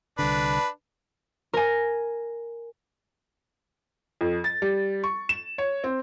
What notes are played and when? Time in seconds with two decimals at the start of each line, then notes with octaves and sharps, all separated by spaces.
0.19 C2 D3 D4 B4
1.53 A#4 G#5
4.21 F2
4.44 A6
4.62 G3
5.04 C#6
5.29 E7
5.58 C#5
5.84 C4